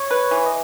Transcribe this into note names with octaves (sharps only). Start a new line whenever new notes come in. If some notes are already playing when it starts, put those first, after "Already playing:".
Already playing: C#5
B4
E3
D#5